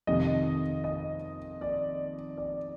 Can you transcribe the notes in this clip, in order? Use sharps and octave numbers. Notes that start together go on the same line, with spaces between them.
F2 C3 D#3 D#5
D#5
D5
D5